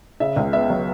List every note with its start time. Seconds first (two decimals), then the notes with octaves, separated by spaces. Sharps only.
0.20 C#3 E5
0.36 C#2
0.53 B3 E5
0.70 F#3